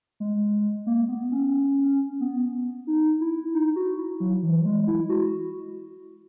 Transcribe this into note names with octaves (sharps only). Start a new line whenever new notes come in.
G#3
A#3
B3
C#4
B3
D#4
E4
D#4
F#4
E4
F#3
E3
G#3
E4
F#4